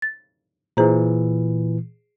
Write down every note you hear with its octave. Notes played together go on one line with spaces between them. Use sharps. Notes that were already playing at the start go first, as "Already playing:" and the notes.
A6
A#2 E3 G#4 C5 A#5